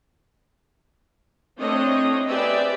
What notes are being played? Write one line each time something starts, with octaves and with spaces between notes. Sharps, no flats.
A3 C4 D4 E4 C#5 D#5
C4 G4 G#4 B4 D5 E5